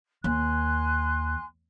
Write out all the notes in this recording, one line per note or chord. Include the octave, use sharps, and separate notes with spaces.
D#2 G#5 C6 F#6